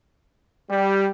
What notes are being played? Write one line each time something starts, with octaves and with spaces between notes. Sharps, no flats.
G3